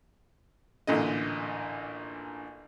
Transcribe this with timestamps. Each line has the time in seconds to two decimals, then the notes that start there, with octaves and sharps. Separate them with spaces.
0.87 A1 A#2 D3 D#5